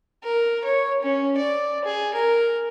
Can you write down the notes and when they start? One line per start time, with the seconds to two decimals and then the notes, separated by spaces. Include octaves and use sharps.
0.24 A#4
0.65 C#5
1.03 C#4
1.38 D5
1.85 G#4
2.14 A#4